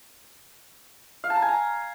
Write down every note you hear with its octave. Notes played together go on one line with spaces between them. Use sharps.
F5
A5
A#5
G#5
A#5